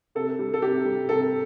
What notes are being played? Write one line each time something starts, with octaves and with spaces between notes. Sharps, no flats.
C3 A4
G3
A4
C3 G4
G3
C3 A4